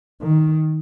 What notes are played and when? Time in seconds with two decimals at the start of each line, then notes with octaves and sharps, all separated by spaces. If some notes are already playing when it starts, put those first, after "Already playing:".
0.21 D#3